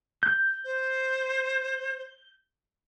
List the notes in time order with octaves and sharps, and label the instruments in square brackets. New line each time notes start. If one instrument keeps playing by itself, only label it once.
[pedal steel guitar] G6
[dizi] C5